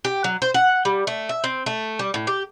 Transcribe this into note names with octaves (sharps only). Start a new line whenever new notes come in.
G4
F#3
C5
F#5
G3
A3
E5
C4
A3
G3
A2
G4